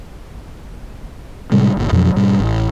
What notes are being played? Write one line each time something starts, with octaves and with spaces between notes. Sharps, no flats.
A2 C3 G3 G#3
G1 A#2
F2 B2 F3 F#3
G#2 B2 G3
A1